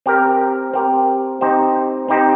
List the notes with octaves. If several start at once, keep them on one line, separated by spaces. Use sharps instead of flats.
C4 G4 A#4
C4 G4 A#4
C4 D#4 G4 C5
C4 D#4 G4 C5